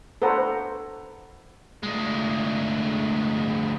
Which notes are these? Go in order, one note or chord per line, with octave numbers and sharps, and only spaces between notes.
A4 B4 C5 F#5 A#5
D2 G#3